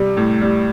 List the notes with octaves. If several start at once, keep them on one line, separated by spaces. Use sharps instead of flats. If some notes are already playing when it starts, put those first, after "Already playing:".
Already playing: C3 G3
A2
G3